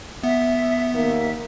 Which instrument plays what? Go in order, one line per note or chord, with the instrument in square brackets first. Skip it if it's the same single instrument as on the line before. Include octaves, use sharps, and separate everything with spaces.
[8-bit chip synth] B3 [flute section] E5
[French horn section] D#2 D#3 A#3 [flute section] E5